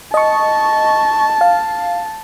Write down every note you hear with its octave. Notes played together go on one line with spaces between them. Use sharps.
D#5 A5 C#6
F5